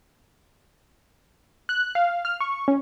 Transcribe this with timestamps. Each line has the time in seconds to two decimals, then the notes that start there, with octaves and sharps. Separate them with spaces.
1.69 F#6
1.95 F5
2.25 F6
2.41 C#6
2.68 C#4